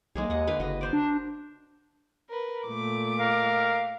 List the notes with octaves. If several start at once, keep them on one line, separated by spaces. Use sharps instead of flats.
B1 G#3 A#3 G#4
D#2 D#5 F#5
D3 B4 F5
F#1 F#4 D#5
A#4 C5 D5
D4
A#4 B4
A#2 A3 D6
A#4 F5